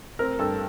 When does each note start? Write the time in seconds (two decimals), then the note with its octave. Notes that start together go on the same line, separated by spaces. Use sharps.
0.19 C4 A#4
0.39 G2 A4